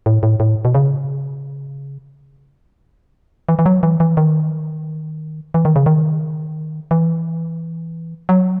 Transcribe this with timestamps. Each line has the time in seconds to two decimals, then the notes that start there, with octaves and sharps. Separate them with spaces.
0.06 A2
0.23 A2
0.40 A2
0.65 B2
0.75 C#3
3.49 E3
3.59 E3
3.66 F#3
3.83 E3
4.00 E3
4.17 D#3
5.54 E3
5.65 D#3
5.76 C#3
5.86 D#3
6.91 E3
8.29 F#3